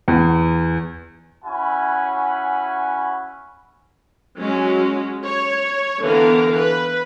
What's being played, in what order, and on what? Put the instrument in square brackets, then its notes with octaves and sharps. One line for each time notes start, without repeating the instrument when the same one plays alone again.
[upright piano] E2
[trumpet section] C#4 E4 F#4 F#5 G#5 B5
[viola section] F#3 G#3 C#4 F#4
C#5
D3 E3 B3 A#4 F5
B4